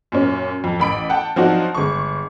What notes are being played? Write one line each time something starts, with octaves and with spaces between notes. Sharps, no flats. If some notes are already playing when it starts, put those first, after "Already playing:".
F#2 A#2 C#4
F2
A1 B5 D7
F#5 G5 A5
F3 F#3 C4 D4 D#4 F#4
G1 G#3 C#6